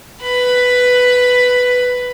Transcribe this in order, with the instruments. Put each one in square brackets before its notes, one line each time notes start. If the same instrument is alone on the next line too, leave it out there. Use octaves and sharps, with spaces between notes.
[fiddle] B4 B5